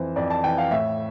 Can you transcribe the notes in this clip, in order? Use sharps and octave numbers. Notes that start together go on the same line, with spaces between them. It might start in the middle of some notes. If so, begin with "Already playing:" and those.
Already playing: F2 E3 C5
F2 D5
A5
E3 G5
F5
A2 E5